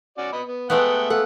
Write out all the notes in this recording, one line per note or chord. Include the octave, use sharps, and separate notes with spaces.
C#4 F#4 D5
B3 D#5 B5
B3
G#3 A3 B3 E5 F#5 G5
A3 A4 F5 F#5